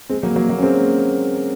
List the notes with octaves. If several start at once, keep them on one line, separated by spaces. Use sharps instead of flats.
G#3 C4
F#3 A#3
F#3 A#3
F#3 A#3
C#4
G#3 C4